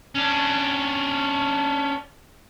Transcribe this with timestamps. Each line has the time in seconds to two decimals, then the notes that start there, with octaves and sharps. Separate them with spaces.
0.15 C#4 D4